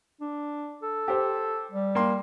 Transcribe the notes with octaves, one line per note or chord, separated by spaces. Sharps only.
D4
A4
G4 C5
G3
A#3 G5 C6